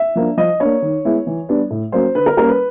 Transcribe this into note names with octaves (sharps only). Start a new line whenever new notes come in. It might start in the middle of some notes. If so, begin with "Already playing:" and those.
Already playing: E5
F3 A#3 D4
F3 D#5
A#3 D4 C#5
D#3
G#3 B3 E4
E3
G3 B3 D4
A2
F#3 A#3 C#4 C5
D3 B4
A#4
G3 A#3 C#4 A#4
B4